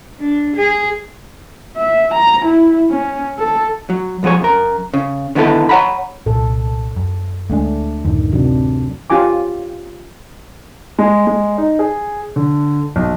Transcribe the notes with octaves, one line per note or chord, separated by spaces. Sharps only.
D4
G#4
E5
A#5
E4
C#4
A4
F#3
B1 F3 F#3 G#4 C#5
F#2 A#4
C#3
D3 D#3 B3 E4 G4 A4
C#5 F5 F#5 A#5 B5
C2 A#2 A4
F#2
D2 G#3 A3 D4
D1 F#2 D#3
C3 F#3 D4
C#4 F4 G4 G#5 D6
G#3
G#3
D#4
G#4
D3
B1